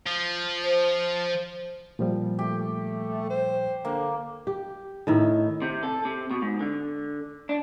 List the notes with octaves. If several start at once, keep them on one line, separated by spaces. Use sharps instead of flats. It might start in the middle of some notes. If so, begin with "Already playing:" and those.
F3
C5
A#2 F3 G3
A3 G4
C5
D3 A#3
G4
A2 D#3 E4
C3
A4
C3
B2
G#2
D3
D4